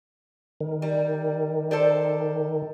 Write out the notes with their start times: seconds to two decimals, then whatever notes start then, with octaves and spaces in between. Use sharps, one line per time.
0.61 D#3
0.82 G3
1.71 A4 C5 D5